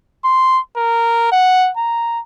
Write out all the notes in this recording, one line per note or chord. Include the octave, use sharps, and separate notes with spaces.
C6
A#4
F#5
A#5